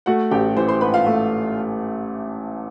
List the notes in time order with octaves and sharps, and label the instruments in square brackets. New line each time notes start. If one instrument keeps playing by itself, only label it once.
[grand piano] A3 [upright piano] F#4 F#5
[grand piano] A1 [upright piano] G4 G5
[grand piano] E3 [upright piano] C5 C6
[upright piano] C5 C6
[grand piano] G#2 [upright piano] B4 B5
[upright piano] F4 F5
[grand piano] A3